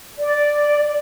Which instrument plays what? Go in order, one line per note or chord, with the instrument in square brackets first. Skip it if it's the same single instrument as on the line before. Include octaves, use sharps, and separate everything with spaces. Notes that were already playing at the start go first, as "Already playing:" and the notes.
[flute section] D5